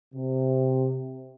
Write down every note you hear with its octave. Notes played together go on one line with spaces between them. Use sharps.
C3